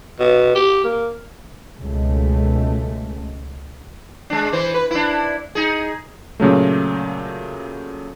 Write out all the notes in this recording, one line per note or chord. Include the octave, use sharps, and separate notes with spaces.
B2
G4
A#3
C#2 B2 G#3 A3
G#3 D4
E3 C5
B4
D4 E4
D#4 G#4
A#2 C#3 F#3 A3